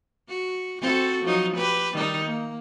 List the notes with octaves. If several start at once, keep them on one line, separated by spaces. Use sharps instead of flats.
F#4
C4 F#4 A4
F3 F#3 D#4
G4 B4
D#3 G3 D#4
A#3